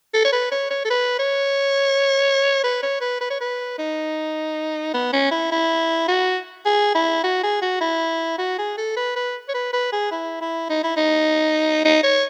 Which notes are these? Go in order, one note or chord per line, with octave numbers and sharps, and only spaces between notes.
A4
C#5
B4
C#5
C#5
A4
B4
C#5
B4
C#5
B4
B4
C#5
B4
D#4
B3
C#4
E4
E4
F#4
G#4
E4
F#4
G#4
F#4
E4
F#4
G#4
A4
B4
B4
C#5
B4
B4
G#4
E4
E4
D#4
E4
D#4
D#4
C#5